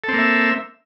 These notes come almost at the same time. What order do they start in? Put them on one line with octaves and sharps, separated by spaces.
A4 C4 A#3 E5